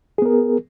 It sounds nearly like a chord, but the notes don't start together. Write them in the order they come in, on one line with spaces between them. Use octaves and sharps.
G#4 B3 A#4